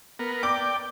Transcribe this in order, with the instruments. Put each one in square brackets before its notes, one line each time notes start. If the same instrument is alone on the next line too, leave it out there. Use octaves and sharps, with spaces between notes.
[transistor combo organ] B3 A#4
[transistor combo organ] D5 G5 [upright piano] D6